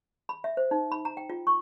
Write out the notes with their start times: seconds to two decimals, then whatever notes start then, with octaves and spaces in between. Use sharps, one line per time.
0.29 B5
0.44 E5
0.57 C5
0.71 D#4
0.92 B5
1.05 A#5
1.17 G5
1.30 F4
1.47 C#6